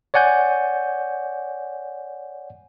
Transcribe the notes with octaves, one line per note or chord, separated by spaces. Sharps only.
C#5 D5 F#5 G#5 G6